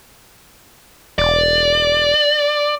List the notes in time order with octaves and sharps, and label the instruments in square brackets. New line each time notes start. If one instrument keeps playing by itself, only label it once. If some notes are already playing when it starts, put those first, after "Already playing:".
[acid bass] E1 [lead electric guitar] D5